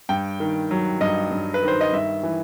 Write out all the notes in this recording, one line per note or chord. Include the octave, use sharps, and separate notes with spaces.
G2 G5
D#3
F#3
G2 D#5
G2
B4
D#3 C5
D#5
G2 E5
E3